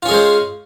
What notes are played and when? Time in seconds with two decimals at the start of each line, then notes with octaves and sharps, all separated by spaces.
0.03 F4
0.05 C#4
0.08 G#4
0.11 G#3
0.13 C5